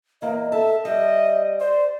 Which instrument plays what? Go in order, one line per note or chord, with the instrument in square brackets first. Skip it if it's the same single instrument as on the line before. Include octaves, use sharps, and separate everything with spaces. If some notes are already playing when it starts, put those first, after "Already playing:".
[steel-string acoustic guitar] E2 A#3 [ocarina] D#5
[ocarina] A4 [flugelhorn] E5 [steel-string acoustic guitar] A5
[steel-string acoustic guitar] G3 [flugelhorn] D#5 [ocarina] E5
[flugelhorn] C5 [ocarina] D5